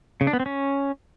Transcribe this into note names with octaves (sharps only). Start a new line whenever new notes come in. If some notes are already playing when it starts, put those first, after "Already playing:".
C#3
D4
B3
C4
C#4